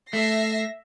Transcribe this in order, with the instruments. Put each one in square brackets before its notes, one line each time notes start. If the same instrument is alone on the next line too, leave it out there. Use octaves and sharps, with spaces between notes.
[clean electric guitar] A3 [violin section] E5 A#6 C7